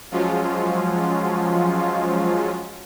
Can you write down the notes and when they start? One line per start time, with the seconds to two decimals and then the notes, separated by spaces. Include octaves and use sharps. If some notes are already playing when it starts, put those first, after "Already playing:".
0.11 F3 F#3 G#3 C#4 F4